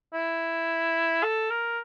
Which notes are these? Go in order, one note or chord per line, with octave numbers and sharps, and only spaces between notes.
E4
A4
A#4